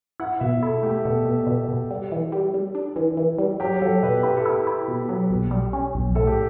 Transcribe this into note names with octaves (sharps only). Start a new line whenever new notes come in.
E4 F#5
B2 E5
E4 A4
A3 G4
B2 A4
B2
B2
B2
G3
E3
G3
G3
D4
E3
E3
G3
F#3 G4
F#3 A4
B2 B4
E4 G4
A4
E4 G4
E4
B2
F#3
B1
G3
C#4
B1
A2 A4
G4